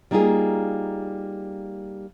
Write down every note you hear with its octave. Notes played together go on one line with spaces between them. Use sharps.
G3 A#3 D#4 F4 G#4